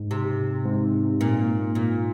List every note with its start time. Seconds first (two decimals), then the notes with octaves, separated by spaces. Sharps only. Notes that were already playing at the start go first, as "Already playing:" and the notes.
Already playing: G#2
0.11 C3
0.65 G#2
1.21 A#2
1.75 A#2